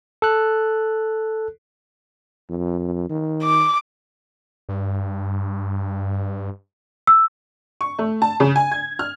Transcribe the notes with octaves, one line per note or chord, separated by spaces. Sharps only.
A4 F#6
F2
D#3
D6
G2
E6
C#6
A3
A5
C#3
G#5
G#6
F6